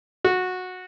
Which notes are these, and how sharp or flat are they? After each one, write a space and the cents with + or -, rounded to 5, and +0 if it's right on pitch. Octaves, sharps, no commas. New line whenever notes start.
F#4 -15